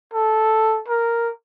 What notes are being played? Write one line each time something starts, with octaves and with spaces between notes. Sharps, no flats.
A4
A#4